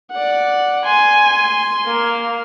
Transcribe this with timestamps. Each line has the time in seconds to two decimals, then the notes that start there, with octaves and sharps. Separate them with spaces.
0.12 D5 F#5
0.86 G#5 C6
1.87 A#3